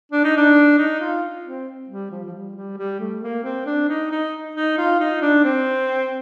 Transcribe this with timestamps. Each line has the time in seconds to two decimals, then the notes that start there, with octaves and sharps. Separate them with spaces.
0.12 D4
0.24 D#4
0.37 D4
0.79 D#4
1.01 F4
1.45 C4
1.89 G3
2.11 F3
2.25 F3
2.33 G3
2.56 G3
2.78 G3
3.00 A3
3.23 A#3
3.44 C4
3.66 D4
3.89 D#4
4.11 D#4
4.55 D#4
4.78 F4
5.00 D#4
5.22 D4
5.44 C4